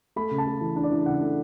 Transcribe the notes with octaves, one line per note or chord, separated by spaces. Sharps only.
A3 B5
C#3
A5
A3
E3
D4
D5
E3
C#3 F#5
A3